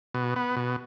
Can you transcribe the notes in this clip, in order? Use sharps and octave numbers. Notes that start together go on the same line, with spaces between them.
B2
B3
B2